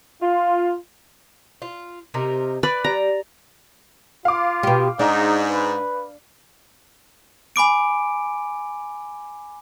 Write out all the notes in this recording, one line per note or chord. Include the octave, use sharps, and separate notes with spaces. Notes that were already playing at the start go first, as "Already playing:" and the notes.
F4
F4
C3 D#4 A#4
B4 D5
G3 A#5
F4 F5 D6
B2 G4
G#2 D4 D#4
B4
G#5 B5 D6 D7